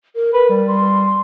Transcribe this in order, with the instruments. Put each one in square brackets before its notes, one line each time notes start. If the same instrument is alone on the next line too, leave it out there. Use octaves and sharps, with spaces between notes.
[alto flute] A#4
[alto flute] A#4 [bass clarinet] B4
[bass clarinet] G3
[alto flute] C6